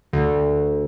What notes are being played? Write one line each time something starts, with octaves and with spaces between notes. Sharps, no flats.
D2